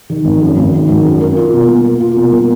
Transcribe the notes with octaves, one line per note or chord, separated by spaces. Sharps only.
D#3
G#1
F#2
G#1
D#3
G#1
F#2
A#4
F4
B2
A#3
A#4
F4
B2
A#3